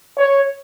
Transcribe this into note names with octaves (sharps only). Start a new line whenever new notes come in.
C#5